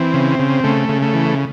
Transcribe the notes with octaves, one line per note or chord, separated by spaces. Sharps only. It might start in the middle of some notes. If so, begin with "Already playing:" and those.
Already playing: E3 C4
C#3
C#3
C#3 A3
C#3
A3
E3